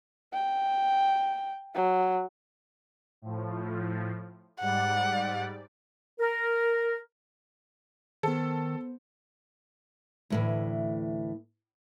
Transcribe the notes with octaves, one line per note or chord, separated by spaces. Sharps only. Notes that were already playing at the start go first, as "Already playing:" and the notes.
G5
F#3
A2 F3
G#2 G3 D5 F#5
A#4
D#3 B3 A4 C5
D2 A2 E3